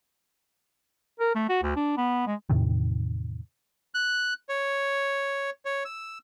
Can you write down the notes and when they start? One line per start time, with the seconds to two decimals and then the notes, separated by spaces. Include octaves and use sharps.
1.20 A#4
1.35 A3
1.49 F#4
1.63 D2
1.76 D4
1.97 B3
2.27 G#3
2.50 E2 A2 C3 D#3
3.94 F#6
4.49 C#5
5.65 C#5
5.85 E6